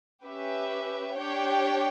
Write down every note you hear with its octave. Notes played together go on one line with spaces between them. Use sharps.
C#4 G4 B4 E5
D4 G4 C#5 G5